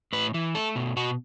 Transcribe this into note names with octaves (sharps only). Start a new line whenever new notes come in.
A2 B4
E3
A3 A4
B2
B2 F#4